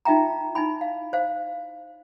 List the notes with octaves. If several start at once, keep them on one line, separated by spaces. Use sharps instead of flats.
D#4 F4 E5 G5 A#5
D#4 E4 G#5 B5
F5
C5 F5